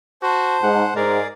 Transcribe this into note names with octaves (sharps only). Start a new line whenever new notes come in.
F#4 C5 A5
G#2 F#5
G#2 G#4 A#4 D5